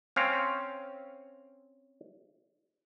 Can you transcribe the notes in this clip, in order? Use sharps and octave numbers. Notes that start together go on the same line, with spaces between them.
C4 C#4 F5